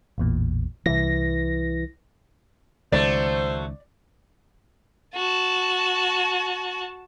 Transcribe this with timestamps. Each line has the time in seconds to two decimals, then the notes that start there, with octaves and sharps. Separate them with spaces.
0.18 A1 E2 A#2
0.86 C2 E3 A#6
2.92 C#2 D#3 F#3 A3 C5 D5
5.15 F#4 A5